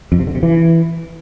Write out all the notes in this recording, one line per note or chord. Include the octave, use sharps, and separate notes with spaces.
F2
C3
D3
C3
E3